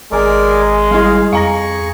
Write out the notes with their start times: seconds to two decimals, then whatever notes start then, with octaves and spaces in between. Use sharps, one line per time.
0.12 G#1 G#3 G#4 A#4 D5
0.91 G3 E4 G#4 F5
1.33 F2 G#4 F5 A#5 C#6 A#6